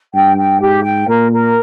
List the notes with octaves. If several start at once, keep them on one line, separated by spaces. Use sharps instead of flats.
G2 G5
G5
G#2 G4
G5
A#2 A#4
A#4